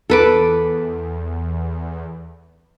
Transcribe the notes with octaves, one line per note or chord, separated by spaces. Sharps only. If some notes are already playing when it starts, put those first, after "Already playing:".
E2 A4 B4 D6